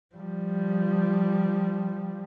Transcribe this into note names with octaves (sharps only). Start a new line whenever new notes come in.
F3 G3